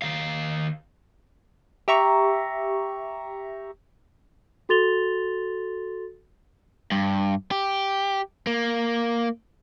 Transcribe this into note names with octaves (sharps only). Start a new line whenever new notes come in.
D#3 F5
G4 E5 A#5 C#6
F#4 A4 C6 A6 F7 G7
G2
G4
A#3